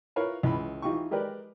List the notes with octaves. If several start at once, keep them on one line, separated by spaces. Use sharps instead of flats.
E4 F4 A#4 B4 C#5 F5
C#2 E3 B5
E3 D#4 F4 G4 C#6
G#3 G4 A#4 B4 D5